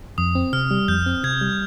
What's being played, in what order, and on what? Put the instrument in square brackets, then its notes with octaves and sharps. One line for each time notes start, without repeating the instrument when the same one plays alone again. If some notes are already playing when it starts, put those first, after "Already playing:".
[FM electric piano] F2 [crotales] D#6
[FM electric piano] C4
[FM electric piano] C3 [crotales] F6
[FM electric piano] G3
[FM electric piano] F2 [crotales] G6
[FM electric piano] C4
[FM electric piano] C3 [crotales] G#6
[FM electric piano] G3